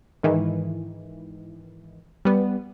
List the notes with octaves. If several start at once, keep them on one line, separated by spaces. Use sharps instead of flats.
G#2 D#3 E3
G3 B3